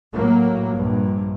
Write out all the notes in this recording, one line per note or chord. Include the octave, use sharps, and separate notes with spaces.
A2 F#3 A#3
A#1 G2